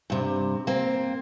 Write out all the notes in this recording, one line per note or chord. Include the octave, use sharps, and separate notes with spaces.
G2 C3
A#3 C4